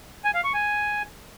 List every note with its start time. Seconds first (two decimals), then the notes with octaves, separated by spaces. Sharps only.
0.25 G#5
0.34 F5
0.44 C#6
0.54 G#5